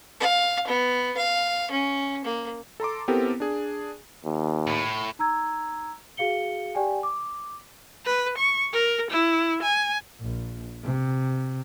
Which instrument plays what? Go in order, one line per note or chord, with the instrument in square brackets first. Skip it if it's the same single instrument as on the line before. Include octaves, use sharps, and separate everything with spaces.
[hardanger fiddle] F5
B3
F5
C#4
A#3
[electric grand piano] A4 A#5 C6 D6
B3 C4 E4 G4 A4 A#4
D4 G#4
[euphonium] D#2
[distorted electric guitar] A2
[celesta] D#4 A#5 E6 G#6
F#4 G#4 F5 C#7 G7
G4 D5 G5 G#5
D6
[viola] B4
C#6
A#4
E4
G#5
[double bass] A#1
C3